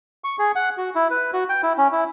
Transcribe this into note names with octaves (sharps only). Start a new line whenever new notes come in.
C#6
G#4
F#5
F#4
E4
B4
F#4
G5
E4
C#4
E4